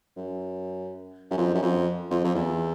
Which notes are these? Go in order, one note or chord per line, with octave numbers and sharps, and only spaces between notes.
F#2
F#2
F2
F#2
F2
F2
F2
E2